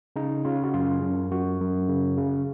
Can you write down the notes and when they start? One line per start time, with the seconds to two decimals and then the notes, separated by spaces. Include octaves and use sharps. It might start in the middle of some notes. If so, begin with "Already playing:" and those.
0.16 C#3 D#4
0.45 C#3 F4
0.64 F#4
0.74 F#2 F4
1.02 F#2
1.31 F#2 F#4
1.60 F#2
1.89 C#3
2.17 C#3